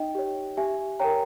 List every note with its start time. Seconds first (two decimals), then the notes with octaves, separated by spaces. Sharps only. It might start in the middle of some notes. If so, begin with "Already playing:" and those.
Already playing: D#4 D#5 G5
0.15 G4 C#5
0.57 G4 E5 G#5
1.00 A#4 C#5 G5 A#5